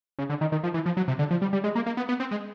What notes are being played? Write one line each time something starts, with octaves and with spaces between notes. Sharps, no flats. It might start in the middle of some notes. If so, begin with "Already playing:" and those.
C#3
D3
D#3
D#3
F3
E3
F3
F#3
C3
D3
F3
G3
G3
G#3
A#3
A#3
B3
B3
C4
G#3